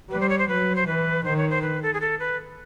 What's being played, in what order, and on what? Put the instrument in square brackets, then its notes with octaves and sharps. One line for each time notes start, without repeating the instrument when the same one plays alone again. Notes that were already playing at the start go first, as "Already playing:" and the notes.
[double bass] G3 [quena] B4
[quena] C5
C#5
C5
[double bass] F#3 [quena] B4
[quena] C5
[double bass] E3 [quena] B4
[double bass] D#3 [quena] C5
[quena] C#5
C5
B4
A4
G#4
A4
B4